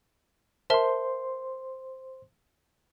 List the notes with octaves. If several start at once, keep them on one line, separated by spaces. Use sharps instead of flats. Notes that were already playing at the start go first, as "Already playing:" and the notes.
A#4 C5 E5 A5 C6